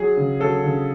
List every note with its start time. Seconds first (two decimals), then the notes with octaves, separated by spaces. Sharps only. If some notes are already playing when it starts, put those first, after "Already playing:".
Already playing: F#3 G#4
0.17 C#3
0.40 F#3 A4
0.64 C#3